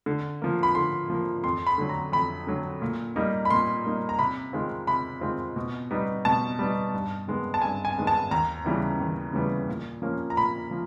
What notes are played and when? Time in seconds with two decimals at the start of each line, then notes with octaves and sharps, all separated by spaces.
0.06 D3
0.42 F3 A#3
0.63 B5
0.75 D3 C6
1.10 F3 A#3
1.44 F2 C6
1.66 B5
1.78 D3 F#3
1.89 A#5
2.12 F2 B5
2.47 D3 F#3
2.82 A#2
3.16 G3 A#3 D#4
3.45 B5
3.50 A#2 C6
3.85 G3 A#3 D#4
4.09 A#5
4.19 C3 B5
4.53 D#3 G#3 C4 F4
4.87 C3 B5
5.21 D#3 G#3 C4 F4
5.56 B2
5.91 G3 B3 D#4
6.25 B2 A5
6.59 G3 B3 D#4
6.93 G2
7.28 D#3 G#3 B3
7.54 A5
7.62 G2 G#5
7.85 G#5
7.97 D#3 G#3 B3
8.07 A5
8.31 D#2 A#5
8.65 C#3 E3 G3 B3
9.00 D#2
9.33 C#3 E3 G3 B3
9.68 A#2
10.02 F3 A#3 C#4
10.30 A#5
10.37 A#2 B5
10.71 F3